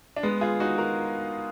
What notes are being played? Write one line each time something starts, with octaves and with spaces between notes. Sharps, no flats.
D4
G#3 B3
F4 G#4
D#4 F#4
F#4 A#4